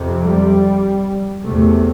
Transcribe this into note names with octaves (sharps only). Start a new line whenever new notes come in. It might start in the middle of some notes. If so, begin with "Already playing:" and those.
Already playing: F2 C3
G3
E2 C3 A3